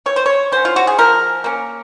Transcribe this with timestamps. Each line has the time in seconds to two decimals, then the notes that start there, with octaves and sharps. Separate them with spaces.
0.06 C3 C#5
0.16 C5
0.26 C#5
0.52 F#3 C#4 C5
0.65 F4
0.76 F#4
0.87 G#4
0.98 F3 A#4
1.44 A#3 C#4